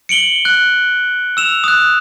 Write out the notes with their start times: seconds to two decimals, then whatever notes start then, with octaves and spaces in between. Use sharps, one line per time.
0.09 C#7 D7 F#7 G7
0.45 F#6
1.37 E6 E7 F7
1.64 D#6 F#6